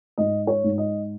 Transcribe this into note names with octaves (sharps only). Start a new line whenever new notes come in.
G#2 D#5
C#5
G#2
D#5